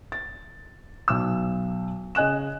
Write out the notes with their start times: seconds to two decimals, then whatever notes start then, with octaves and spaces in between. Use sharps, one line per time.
0.12 A6
1.08 B1 E6
2.15 C#3 D#5 G#5 F#6 E7